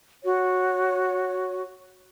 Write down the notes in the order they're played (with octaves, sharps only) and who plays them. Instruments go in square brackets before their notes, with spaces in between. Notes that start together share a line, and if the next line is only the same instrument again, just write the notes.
[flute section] F#4 C#5